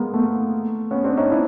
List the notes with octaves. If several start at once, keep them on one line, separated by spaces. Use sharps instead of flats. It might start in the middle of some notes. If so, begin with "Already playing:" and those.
Already playing: G#3 A#3 B3
A3 B3
B3 C#4
C4 D4
C#4 D#4
D4 E4